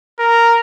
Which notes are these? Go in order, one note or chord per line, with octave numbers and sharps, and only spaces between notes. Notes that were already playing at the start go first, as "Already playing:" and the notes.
A#4